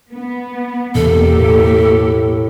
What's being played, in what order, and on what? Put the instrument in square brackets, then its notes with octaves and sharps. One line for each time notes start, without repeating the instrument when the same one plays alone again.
[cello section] B3
[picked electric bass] E2 B2 [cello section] A#3 G4 [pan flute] A4
[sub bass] A2